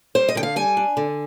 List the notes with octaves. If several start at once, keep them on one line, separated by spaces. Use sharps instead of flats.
G3 C5
D#5
D3 G5
F5
G3 G#5
D4
D3